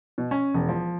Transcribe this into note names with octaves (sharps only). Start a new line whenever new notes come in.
B2
C#4
E1
F3